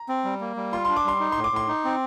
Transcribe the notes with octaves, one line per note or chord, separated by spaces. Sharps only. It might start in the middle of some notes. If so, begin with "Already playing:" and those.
Already playing: A#5
C4
G3
A#3
G3
F4 C6
D4 C6
D6
G3 C6
D#4
A2 C6
D6
A2 C6
D#4
C4